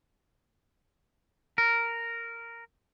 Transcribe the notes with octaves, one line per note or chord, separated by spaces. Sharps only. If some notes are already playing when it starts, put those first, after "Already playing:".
A#4